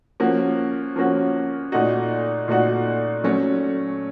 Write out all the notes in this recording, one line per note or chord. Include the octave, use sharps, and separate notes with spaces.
F3 A#3 C#4 F#4
F3 A#3 C#4 F#4
A#2 A3 D#4 F#4
A#2 A3 D#4 F#4
F#3 A3 C#4